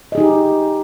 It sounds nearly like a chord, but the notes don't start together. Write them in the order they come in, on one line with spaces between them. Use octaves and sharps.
D#5 G#4 D#4 G4